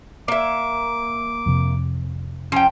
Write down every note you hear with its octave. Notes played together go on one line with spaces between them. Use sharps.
A#3 E5 D6
F2 C3
F3 C#4 G5